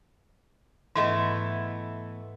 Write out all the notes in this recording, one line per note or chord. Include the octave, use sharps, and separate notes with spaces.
G#2 E3 A3 B3 D#5